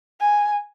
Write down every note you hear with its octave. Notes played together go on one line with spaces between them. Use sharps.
G#5